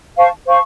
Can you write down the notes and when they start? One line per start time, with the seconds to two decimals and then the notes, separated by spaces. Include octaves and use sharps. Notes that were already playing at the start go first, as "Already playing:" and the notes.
0.17 C5 F5 A5 C#6
0.46 C5 F5 A5 C#6